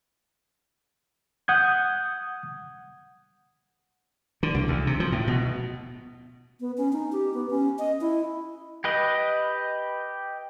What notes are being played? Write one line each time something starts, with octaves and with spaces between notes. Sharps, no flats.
F#5 D#6 G6 G#6
D3
C2
D2
C3
F3
A2
B2
B3
C#4
D#4
G4
B3
C#4
D#5
E4
G4 B4 D#5